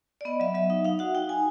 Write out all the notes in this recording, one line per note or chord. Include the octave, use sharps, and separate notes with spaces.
D5
B3 D#5
F#3 E5
F#3 E5
D#4 E5
D#4 F5
F#4 F#5
D#4 G5
D#4 G#5